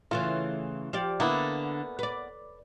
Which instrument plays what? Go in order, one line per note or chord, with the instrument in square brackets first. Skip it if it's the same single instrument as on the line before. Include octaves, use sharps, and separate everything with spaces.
[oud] C#3 E3 A3 [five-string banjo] F4
[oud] F3 G4 D5
[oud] D3 [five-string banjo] A#3 B3 E4
[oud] B4 D5